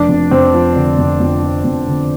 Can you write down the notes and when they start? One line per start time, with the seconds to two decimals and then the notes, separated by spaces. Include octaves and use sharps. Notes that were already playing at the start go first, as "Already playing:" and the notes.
Already playing: F1 D4
0.09 F2
0.31 F2 C4
0.53 F3
0.76 D3
0.98 F2
1.20 F2
1.43 F3
1.65 F2
1.88 D3